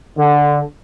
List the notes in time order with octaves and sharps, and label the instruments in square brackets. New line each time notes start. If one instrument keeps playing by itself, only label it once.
[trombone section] D3